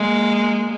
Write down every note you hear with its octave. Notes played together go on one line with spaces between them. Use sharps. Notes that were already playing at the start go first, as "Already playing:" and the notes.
Already playing: G#3 A#3